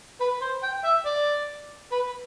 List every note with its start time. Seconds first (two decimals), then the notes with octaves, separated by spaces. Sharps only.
0.21 B4
0.42 C5
0.63 G5
0.84 E5
1.06 D5
1.92 B4